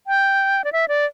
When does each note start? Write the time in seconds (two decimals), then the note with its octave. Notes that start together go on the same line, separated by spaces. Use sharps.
0.07 G5
0.64 D5
0.72 E5
0.88 D5